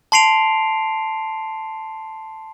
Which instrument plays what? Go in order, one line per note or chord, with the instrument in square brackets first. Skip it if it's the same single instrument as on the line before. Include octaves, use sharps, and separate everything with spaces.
[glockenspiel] A5 C6 C7 D7 F7